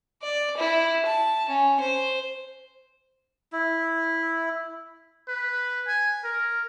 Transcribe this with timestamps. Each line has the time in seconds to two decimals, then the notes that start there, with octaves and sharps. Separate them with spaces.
0.22 D5
0.57 E4
1.05 A5
1.49 C#4
1.80 C5
3.53 E4
5.28 B4
5.87 G#5
6.24 A#4